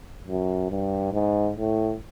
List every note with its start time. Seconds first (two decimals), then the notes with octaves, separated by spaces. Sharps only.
0.28 F#2
0.70 G2
1.13 G#2
1.56 A2